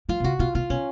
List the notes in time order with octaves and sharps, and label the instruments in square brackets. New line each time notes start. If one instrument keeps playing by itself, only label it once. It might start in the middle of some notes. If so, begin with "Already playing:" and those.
[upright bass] F3 [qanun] F4
[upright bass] B2
[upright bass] C#3 [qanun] F#4
[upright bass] B2 [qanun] F4
[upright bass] B2 [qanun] F4
[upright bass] B2 [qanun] C#4